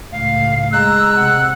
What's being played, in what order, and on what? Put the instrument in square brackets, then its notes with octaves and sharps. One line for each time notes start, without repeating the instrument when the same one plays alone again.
[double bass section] C#2 A2 [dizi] F5
[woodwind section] G#3 E6 [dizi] A#5 [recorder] F#6
[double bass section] C3 [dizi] F#5